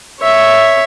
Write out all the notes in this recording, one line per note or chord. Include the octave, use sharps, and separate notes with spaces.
C#5 E5